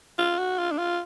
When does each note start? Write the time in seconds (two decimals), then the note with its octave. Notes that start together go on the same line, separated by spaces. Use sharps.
0.18 F4
0.39 F#4
0.58 F4
0.72 D4
0.78 F4